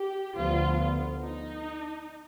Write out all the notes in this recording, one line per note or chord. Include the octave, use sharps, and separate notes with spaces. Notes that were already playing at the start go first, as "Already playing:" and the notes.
Already playing: G4
D2 D3 F3 B3 F4
D#4